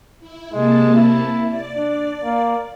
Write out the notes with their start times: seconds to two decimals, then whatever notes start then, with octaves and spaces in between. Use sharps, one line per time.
0.20 E4
0.53 C3 G#3 A#3 A5
0.95 E4
1.47 D5
1.77 D4
2.24 A#3